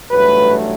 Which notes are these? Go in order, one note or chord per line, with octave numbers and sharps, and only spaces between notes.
A1 G2 F#3 A3 B4